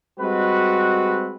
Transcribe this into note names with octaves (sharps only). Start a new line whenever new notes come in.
G3 G#3 C4 F#4 B4